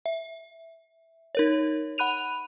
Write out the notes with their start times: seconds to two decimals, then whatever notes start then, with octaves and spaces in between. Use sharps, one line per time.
0.06 E5
1.35 D#4 A#4 C#5
1.98 F#5 B5 F#6 D#7 F7